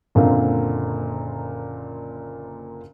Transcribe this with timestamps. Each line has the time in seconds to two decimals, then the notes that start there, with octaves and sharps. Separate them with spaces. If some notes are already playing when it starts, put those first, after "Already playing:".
0.15 F#1 A#2 D3 C4 F5